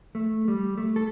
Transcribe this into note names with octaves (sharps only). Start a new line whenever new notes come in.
A3
G3
A3
A4